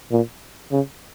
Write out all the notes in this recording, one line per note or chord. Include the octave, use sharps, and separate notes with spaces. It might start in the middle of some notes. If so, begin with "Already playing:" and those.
A#2
C#3